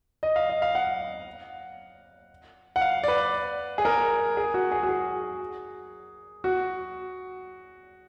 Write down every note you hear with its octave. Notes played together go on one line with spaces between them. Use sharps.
D#5
F5
D#5
F5
F#5
F#5
F5
D5
B4
G#4
A#4
G#4
F#4
G#4
F#4
G#4
F#4